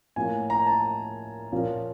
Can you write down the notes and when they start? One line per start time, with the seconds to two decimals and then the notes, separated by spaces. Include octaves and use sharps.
0.16 A2 F3 A#3 C#4 G#5
0.50 A#5
0.67 A5
1.52 A#2 F3 A#3 C#4